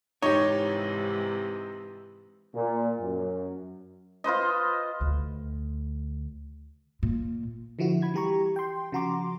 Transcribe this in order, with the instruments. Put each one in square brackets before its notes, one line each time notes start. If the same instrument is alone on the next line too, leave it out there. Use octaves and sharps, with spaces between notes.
[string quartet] G#2 C3 E3 [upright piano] D#4 G4 [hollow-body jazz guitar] C#5
[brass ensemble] A#2
F#2
[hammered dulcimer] F4 B4 C5 D#5
[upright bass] D2
A#2
[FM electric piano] D3 F3 E4 F#4
B5 G#6
E3 G3 G4 A#5 C#6
G5 C6
C#3 F3 F#4 A#5 C6 D6